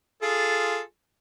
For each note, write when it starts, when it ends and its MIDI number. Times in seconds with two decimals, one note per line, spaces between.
0.22 0.81 65
0.22 0.81 68
0.22 0.81 69